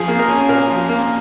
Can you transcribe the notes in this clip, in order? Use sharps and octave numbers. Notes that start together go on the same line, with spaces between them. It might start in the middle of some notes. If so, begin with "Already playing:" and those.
Already playing: F3 G#4
A#3
A#4
C#4
A#2 A#4
F3
A#3